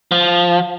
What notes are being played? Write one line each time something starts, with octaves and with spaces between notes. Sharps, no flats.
F3